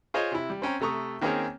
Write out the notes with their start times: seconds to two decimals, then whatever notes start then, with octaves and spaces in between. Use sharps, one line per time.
0.14 F4 G#4 C5 C#5 D#5 G#5
0.32 C3 E4
0.50 G3
0.62 C4 C#4 G5 A#5
0.81 C3 A3 A#5 C#6 D#6
1.21 D#3 A#3 C4 C#4 G#4 C#5